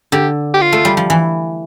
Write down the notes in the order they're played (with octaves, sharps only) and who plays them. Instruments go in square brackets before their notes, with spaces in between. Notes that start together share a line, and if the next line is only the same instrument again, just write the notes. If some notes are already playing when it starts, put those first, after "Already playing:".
[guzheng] D3 [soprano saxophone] G4
[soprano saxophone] G4
F4
[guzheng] A3
G3
F3
E3